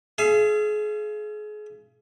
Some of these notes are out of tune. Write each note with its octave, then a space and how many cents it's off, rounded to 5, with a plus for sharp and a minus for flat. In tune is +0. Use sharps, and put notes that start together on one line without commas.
G#4 +30 F5 -40